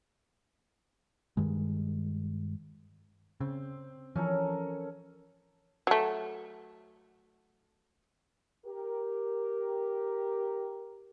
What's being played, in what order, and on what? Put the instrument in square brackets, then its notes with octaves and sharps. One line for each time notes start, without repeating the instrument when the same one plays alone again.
[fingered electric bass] G2 D#3 G#3
[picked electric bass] C#3 [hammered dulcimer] C4
[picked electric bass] E3 F3 [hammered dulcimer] C#4 A4 A#4
[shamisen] F#3 A3
[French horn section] G4 A#4